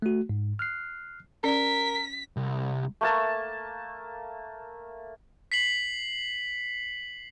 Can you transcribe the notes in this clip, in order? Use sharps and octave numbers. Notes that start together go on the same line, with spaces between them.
A3 F#4
G#2
F6 F#6 C7
C#4 A#4 D5 B6
C2
A3 A#3 A5
B6 C7 F#7